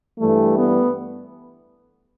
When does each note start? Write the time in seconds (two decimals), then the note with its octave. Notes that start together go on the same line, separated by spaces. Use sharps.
0.19 G2 E3 G3 A3
0.58 B3